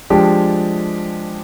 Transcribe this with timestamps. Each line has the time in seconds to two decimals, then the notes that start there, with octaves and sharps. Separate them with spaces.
0.10 F3 G#3 D4 G4